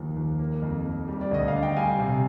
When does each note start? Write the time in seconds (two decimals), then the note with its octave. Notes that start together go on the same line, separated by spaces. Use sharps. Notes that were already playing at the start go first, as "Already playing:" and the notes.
Already playing: D#2 F3
0.17 D#2
0.39 A#3
0.62 F2
0.85 F2
1.08 G3
1.21 D5
1.31 D2 D#5
1.48 D4 F5
1.63 G5
1.76 G3 F5 G#5
1.99 C3